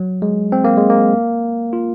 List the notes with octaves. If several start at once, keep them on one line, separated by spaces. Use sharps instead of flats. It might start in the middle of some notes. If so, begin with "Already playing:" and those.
Already playing: F#3
G#3
C4
A#3
G#3
A#3
F4